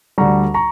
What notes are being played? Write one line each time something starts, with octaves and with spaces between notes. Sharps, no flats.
D2 D3 G3 A#5 C#6
A#5 C#6